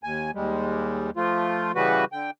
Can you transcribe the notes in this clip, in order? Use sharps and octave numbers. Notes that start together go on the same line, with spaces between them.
D#2 G#5
D#2 G3 G#3
F3 A3 F4
C#3 E3 G3 F#4 B4
D3 G5